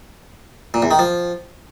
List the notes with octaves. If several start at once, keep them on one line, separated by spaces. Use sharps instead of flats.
A#2
E2
D#3
F3